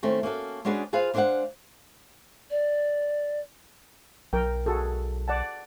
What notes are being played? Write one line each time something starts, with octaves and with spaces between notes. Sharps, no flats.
D#3 A3 C4 C#4
A#3 C#4 F#4 A4
G#3 C#4 D4 F#4 G#4 B4
F4 G#4 B4 C5 F5
G#3 D4 C5 C#5 F5 F#5
D5
B1 A#4 G5
F#4 G#4 A4
D5 F#5 A5